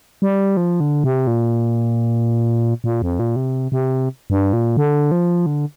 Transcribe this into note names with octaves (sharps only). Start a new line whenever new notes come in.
G3
F3
D3
C3
A#2
A#2
F2
A#2
C3
C3
G2
A#2
D3
F3
D3